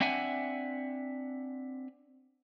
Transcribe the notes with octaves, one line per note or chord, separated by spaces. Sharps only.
C4 D4 E5 F#5 G#5